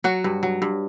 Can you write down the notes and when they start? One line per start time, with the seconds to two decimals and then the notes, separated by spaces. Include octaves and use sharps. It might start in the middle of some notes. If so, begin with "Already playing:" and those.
0.04 F#3 F#4
0.24 G2
0.43 F#3
0.62 G2